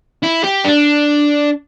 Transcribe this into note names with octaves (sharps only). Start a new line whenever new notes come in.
E4
G4
D4